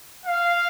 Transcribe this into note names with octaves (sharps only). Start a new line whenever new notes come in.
F5